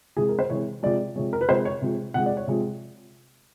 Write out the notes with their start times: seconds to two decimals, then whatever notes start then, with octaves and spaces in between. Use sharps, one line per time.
0.17 C3 E3 G#3 G#4
0.29 A#4
0.39 C5
0.50 C3 E3 G#3 C#5
0.83 C3 F3 G#3 D5
1.16 C3 F3 G#3 C#5
1.33 A#4
1.41 B4
1.49 C3 F3 G#3 C5
1.65 C#5
1.82 C3 F3 G#3
2.14 C3 F3 G#3 F#5
2.26 D5
2.37 C#5
2.47 C3 F3 G#3